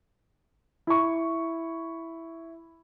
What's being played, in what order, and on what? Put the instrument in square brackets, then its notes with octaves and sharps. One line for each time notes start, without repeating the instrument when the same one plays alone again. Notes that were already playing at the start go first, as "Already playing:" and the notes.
[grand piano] E4 C#6